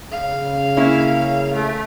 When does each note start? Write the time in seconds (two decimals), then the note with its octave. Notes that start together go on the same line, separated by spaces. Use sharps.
0.11 C#3 F5
0.77 A#3 C#4 E4
1.54 A3